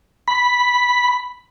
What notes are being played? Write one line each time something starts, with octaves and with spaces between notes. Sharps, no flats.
B5